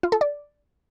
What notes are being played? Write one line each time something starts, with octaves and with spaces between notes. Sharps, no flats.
F4
A4
D5